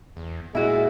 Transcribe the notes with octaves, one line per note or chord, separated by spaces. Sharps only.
E2
A#2 G#3 E4 F#4